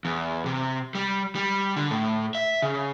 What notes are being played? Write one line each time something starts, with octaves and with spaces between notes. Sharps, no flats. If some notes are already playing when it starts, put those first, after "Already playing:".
E2
C3
G3
G3
D3
A2
E5
C#3